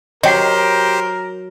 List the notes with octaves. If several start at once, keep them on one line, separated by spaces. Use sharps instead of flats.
F#3 G4 A#4 C5 D#5 G5 C7